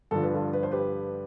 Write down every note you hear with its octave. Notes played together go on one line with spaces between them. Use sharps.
G2 D3 F3 A4
B4
F4 A4
B4
C5
G4 B4